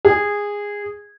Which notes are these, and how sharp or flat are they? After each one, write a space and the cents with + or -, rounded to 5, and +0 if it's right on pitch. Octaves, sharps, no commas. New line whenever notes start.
G#4 -15